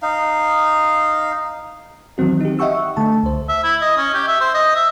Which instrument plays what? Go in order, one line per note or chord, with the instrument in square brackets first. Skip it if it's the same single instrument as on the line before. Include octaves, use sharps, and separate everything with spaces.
[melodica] D#4 F5
[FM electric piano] D#3 E3 F#3 C4 F#4
D#4 G4
D#5 E5 F#5 G5 C#6 E6
D3 A3 A5
C#2 C5
[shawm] E5
E4
D#5
C#4
G4
E5
C5
D#5
E5